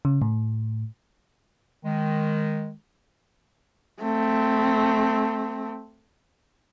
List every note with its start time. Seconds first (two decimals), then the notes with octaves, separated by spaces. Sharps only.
0.05 C#3
0.22 A2
1.84 D#3 G#3
4.02 A3 C4